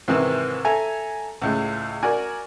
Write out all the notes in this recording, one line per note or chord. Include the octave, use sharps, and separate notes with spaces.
G#2 C3 D#3 E3
A4 E5 G#5 A#5
C#2 A2 G#3
F#4 A#4 D5 G#5